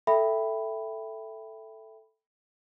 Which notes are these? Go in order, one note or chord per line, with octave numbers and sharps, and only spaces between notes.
A4 E5 G5 B5